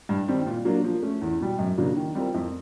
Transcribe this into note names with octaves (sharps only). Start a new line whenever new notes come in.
G2
D#3 G3 C4
A#2
F#3 A#3 D4
F3
A3 C#4
E2
B2 G3
F#2
C#3 F#3 A#3 D4
D#3
G3 C4 F4 A#4
F2